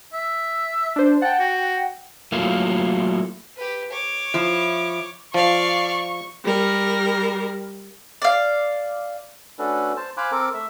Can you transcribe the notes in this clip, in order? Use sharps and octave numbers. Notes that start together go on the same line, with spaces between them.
E5
D4 C5
F#5 G5 A5
F#4
F#3 A3 A#3 E4 F4
G4 B4
C#5 D6
F3 E4
F3 D5 F5 C#6
G3 A#4
D5 F5
A3 C#4 D4 F#4 A4 B4
C5 A5
C5 F5 G#5 B5 D6 F#6
C4 A4 A#4 D6
A3 E5